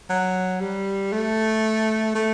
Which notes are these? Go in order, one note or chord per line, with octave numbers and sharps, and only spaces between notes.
F#3
G3
A3
A3